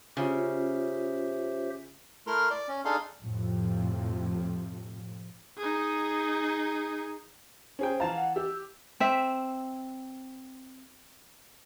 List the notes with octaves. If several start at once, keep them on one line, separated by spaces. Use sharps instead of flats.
C#3 C#4 F4 G4 C5 C#5 E5
A3 E4 A#4 C6 F6
D5
C#4
D4 D#4 G#4 A4 F5 C6
F2 A2 C3 F3
D#4 G#4
C#4 G#4 C5 G5
E3 F5 A5 A#5
F#5
G4 E6
C4 E5